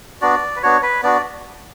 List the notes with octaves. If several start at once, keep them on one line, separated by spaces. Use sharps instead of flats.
B3 D4 F#4 D5
B4
B3 D4 F#4 C#5
B4
B3 D4 F#4 D5